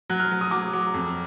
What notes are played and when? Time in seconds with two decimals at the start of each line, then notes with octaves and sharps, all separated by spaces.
0.09 F#3 F#6
0.20 F6
0.31 F#3
0.41 D#6
0.51 F#3 D6
0.73 F#3
0.94 F2